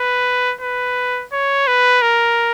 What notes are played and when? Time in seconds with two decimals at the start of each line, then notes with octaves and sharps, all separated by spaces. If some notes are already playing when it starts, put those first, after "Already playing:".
Already playing: B4
0.61 B4
1.32 C#5
1.67 B4
2.02 A#4